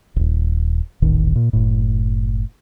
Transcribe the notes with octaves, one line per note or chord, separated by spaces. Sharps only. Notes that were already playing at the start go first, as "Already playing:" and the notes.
D#1 G#1
D#1 A1 D#3
A#2
F#1 A2